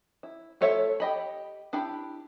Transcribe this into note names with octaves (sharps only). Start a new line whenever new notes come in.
E4
A3 F4 A4 C#5 E5
G4 D#5 B5
D4 E4 G4 B5